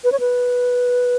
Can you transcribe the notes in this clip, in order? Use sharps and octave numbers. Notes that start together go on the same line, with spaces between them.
B4
C#5
B4